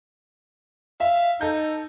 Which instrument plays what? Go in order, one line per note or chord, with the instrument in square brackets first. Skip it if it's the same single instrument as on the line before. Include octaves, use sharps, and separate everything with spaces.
[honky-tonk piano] E5 [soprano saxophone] F5
[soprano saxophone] D#4 [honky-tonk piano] A4 G6